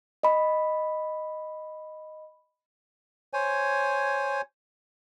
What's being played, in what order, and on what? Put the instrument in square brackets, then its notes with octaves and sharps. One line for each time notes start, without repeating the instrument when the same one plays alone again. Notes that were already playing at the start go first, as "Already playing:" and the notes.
[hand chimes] D#5 B5
[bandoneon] C5 C#5 G#5